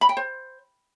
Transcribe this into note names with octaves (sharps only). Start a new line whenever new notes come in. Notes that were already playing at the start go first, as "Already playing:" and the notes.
B5
G5
C5